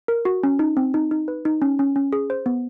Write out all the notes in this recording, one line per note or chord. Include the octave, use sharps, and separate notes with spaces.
A#4
F#4
C#4
D#4
C4
D#4
D#4
B4
D#4
C#4
C#4
C#4
G#4
C5
B3